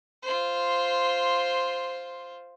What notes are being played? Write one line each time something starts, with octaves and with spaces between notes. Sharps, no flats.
F4 C5